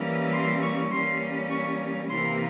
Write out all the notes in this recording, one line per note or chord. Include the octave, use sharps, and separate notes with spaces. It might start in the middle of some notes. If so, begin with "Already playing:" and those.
Already playing: E3 G3 A#3 C#4
C6
C#6
E3 G3 A#3 C#4 C6
C#6
C3 E3 A#3 C6